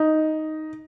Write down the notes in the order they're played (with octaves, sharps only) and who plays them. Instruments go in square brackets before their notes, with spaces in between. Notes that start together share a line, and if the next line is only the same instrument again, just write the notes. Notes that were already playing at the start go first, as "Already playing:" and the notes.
Already playing: [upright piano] D#4